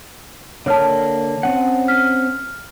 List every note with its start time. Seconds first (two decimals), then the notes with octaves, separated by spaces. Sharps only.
0.66 D3 A#3 C#5 A5 F6
1.43 C4 C#4 F#5
1.88 F6 B6